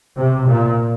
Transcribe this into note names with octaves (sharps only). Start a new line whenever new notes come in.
C3
A#2